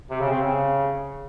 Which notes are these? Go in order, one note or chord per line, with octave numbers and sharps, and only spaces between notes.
C3
C#3
C4
C#3